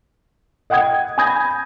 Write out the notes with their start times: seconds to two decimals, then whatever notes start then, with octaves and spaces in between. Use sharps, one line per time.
0.70 D#5 F#5 G5 D#6 G#6
1.18 G#5 B5 D#6 G6 G#6 A#6